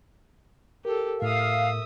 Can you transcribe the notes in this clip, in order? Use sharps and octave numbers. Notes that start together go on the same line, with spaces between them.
G4 A4 A#4
A2 E5 F5 D#6